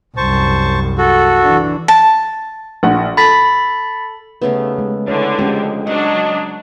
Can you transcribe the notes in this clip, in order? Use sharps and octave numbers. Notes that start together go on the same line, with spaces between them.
C2 F#2 C5 A5 C#6
F#4 A4
E3 D4
A5
A#1 F#5
A4 B5 A6 B6
D#2 C#3 A3 B3
G#3
D3 E3 C#5
F2 G#3 C#4 G4
F#3 D4 D#5 F#5